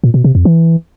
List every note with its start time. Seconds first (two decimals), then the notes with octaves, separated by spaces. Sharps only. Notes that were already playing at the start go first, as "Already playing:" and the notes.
0.04 A#2
0.14 B2
0.24 C3
0.35 F2
0.45 E3